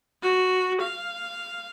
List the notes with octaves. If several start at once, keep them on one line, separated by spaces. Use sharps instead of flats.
F#4
F5